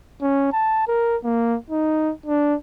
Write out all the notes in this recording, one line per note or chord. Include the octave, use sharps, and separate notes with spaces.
C#4
A5
A#4
A#3
D#4
D4